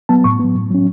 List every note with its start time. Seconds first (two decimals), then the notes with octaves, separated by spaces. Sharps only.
0.09 F#3 B3 A5
0.24 A2 C#6
0.39 F#3 B3
0.55 A2
0.71 F#3 C#4